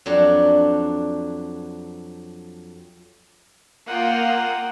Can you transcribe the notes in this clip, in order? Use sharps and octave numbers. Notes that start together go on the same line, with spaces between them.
F2 F#3 D4
A#3 F4 F#5 G5 D#6